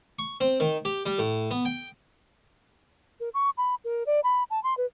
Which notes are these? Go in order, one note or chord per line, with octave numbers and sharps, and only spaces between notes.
C#6
C4
D#3
G4
G3
A2
B3
G5
A#4
C#6
B5
A#4
D5
B5
A5
C6
B4